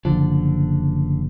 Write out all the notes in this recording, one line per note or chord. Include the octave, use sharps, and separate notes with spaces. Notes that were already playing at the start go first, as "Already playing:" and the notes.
F#1 D3 F3